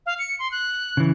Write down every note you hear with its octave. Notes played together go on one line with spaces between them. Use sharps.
F5
C#7
C6
F#6
C#3 E3